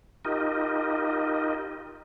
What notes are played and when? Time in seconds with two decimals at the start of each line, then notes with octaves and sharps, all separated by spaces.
0.25 D#4 F4 G4 A#4 D#5